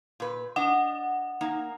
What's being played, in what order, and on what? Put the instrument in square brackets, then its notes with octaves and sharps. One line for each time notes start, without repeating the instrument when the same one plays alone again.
[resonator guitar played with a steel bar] A#2 B4
[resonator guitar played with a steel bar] D4 D#5 [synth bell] F#5
[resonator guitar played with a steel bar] A#3 D#4